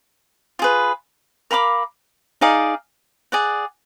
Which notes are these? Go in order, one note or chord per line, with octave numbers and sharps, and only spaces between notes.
F4 G#4 B4
A#4 F5 B5 D6
D#4 G#4 D5 F5
G#4 D5 F#5